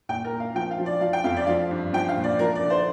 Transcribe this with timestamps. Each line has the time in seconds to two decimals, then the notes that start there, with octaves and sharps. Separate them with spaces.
0.09 A#2 G5
0.24 A#4
0.32 A#2
0.40 F5
0.55 F3 G5
0.71 F5
0.78 F3
0.86 D5
1.01 F3 F5
1.13 G5
1.24 F2 F5
1.36 D5
1.47 F3 F5
1.71 G2
1.93 F3 G5
2.09 F5
2.17 A#2
2.24 D5
2.39 F3 A#4
2.55 D5
2.63 D3
2.70 C5